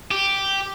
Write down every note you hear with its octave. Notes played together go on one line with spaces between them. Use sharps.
G4